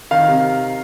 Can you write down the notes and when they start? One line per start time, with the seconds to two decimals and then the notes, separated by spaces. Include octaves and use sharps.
0.11 D#3 F5
0.28 C3